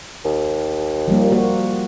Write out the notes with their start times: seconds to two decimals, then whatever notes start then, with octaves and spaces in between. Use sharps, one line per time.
0.25 D#2
1.08 F3 G3 A#3
1.32 A#3 F#4